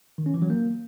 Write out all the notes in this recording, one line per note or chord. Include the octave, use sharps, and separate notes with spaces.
D#3
C#4
E3
F#3
A#3